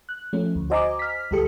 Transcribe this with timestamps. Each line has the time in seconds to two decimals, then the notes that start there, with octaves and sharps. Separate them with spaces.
0.09 F#6
0.33 F3 A3 C#4
0.55 D2
0.70 F#4 C5 D#5 G#5 A#5 D6
0.99 F6 B6
1.31 D2 G3 G4 A4 C#7